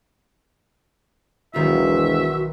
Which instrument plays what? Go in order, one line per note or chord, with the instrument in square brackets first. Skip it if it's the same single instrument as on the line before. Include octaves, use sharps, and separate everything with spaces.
[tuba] E1 [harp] B1 D#3 F4 [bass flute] F#4 [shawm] E5